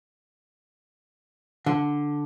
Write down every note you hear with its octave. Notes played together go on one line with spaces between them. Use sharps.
D3